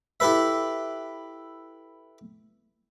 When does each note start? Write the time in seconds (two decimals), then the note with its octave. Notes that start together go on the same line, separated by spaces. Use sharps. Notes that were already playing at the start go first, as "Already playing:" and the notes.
0.20 E4 G4 A4 B4 E5